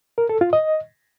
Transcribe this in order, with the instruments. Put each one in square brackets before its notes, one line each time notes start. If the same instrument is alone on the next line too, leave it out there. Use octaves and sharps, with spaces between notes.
[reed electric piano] A#4
A4
F4
D#5